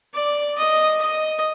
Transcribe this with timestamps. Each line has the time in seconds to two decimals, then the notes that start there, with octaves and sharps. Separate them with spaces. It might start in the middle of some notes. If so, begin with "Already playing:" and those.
0.14 D5
0.58 D#5
1.01 D#5